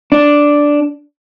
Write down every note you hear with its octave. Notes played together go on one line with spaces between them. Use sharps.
D4